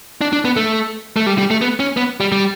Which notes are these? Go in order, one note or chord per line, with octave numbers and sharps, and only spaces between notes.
D4
D4
B3
A3
A3
G3
G3
A3
B3
C#4
B3
G3
G3